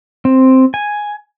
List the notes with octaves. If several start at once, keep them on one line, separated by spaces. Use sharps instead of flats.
C4
G#5